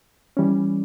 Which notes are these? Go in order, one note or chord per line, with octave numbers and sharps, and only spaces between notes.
E3 G3 C#4